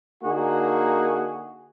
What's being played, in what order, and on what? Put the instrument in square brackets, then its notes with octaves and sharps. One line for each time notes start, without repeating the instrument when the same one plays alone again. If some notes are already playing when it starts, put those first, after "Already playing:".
[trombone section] D3 A#3 D#4 F#4 G#4